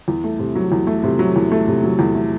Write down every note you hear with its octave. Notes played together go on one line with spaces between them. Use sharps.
E2
A3
C3
F#3
E2
A3
C3
F#3
E2
A3
C3
F#3
E2
A3